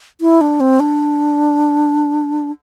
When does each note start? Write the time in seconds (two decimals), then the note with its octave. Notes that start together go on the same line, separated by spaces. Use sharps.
0.21 E4
0.41 D4
0.60 C4
0.80 D4